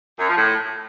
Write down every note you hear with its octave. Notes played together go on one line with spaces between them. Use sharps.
F#2
F3
A2